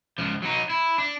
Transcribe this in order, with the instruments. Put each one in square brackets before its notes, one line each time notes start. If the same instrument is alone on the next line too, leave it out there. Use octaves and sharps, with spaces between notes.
[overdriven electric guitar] C#2 F3
F#3 D#4
E4
D4